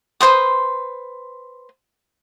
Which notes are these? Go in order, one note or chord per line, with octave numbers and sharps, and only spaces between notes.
B4 C5 C6 D#6